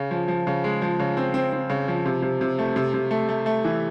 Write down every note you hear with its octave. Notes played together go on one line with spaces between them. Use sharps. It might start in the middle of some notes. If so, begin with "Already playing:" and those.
Already playing: C#3
F3
F3
C#3
G#3
F3
C#3
C4
C4
C4
C#3
F3
C3
C3
C3
A3
C3
C3
A3
A3
A3
E3